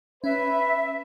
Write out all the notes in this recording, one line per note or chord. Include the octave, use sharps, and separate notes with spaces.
C#4 B4 E5